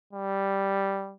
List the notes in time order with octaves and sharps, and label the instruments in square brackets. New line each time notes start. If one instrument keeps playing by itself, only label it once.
[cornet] G3